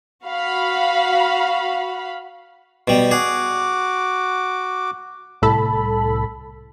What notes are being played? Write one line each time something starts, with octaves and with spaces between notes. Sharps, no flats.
F#4 F5 B5
B2 G3
F#4 G#4 D6
C2 A2 A4 B5